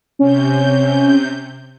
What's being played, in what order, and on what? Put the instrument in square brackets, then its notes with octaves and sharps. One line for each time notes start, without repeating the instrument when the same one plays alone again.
[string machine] C3 G6 [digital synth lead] C#4